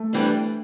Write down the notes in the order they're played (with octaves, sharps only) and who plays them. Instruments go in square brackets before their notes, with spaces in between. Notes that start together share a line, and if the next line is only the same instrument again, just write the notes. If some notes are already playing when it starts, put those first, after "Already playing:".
Already playing: [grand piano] A3
[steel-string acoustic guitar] E3 G3 D4